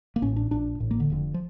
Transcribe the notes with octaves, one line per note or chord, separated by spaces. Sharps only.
A#3
A1 A2 C#4
D4
A#1 A#2 D4
A1 A2
A#3
D3
F1 F2 D3
F3